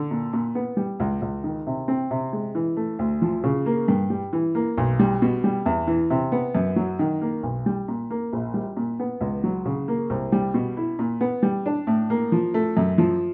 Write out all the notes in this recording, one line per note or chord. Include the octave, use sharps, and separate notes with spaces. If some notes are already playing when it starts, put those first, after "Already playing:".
Already playing: D3
A#2
A#2
B3
G3
C#2
C#2
D#3
C3
C4
C3
G#3
E3
A3
D2
F3
C#3
A#3
G2
G3
E3
A#3
B1
G3
B2
G3
E2
E3
C3
B3
F#2
F#3
D#3
A#3
B1
G3
A#2
A#3
A#1
G3
A#2
B3
C#2
F#3
C#3
A#3
C2
G3
B2
E4
A#2
B3
G3
D4
A2
A#3
F3
A3
F#2
F3